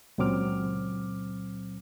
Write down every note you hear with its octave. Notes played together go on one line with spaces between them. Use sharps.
C#2 A#2 F#3 C4 D6 F6